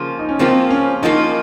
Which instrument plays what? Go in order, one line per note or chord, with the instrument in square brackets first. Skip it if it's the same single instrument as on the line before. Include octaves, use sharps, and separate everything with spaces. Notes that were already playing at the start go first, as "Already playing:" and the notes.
Already playing: [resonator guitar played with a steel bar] C#3 F3 A#3 F4
[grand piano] D#4
C#4
[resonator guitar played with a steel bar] C#3 F3 A#3 F4 [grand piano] C4
[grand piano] C#4
[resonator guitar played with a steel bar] C#3 F3 A#3 F4 [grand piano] D#4